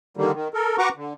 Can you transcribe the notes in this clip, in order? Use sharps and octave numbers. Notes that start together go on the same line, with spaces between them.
D3 D#3 G3 A#3
D#3
A4 A#4
F#4 B4 F#5 A#5 C#6 D6
D3